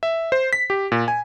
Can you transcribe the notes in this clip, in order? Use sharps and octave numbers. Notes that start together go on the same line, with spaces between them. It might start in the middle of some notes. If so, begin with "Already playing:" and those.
E5
C5
B6
G4
A#2
G#5